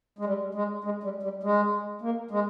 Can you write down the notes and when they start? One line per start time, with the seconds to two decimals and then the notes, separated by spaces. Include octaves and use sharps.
0.19 G#3
0.25 G3
0.55 G#3
0.84 G#3
1.03 G3
1.23 G3
1.43 G#3
2.01 A#3
2.31 G#3